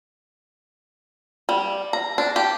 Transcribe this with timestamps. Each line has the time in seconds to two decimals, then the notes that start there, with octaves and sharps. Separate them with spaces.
1.49 G3
1.93 A#5
2.18 D4
2.36 G4